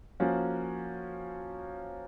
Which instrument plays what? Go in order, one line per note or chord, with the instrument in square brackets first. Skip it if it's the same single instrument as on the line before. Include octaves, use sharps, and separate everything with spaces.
[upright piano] F3 A#3 C#4 F#4